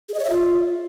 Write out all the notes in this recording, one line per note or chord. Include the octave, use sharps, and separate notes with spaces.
G#4
D#5
C#5
E5
F4